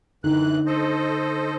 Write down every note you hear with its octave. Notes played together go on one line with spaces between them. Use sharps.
F#2 D3 E3 D#4 F#6
A4 C5 D#5